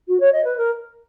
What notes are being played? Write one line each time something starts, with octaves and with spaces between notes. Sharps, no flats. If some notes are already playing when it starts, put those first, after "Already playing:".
F#4
C#5
D#5
B4
A#4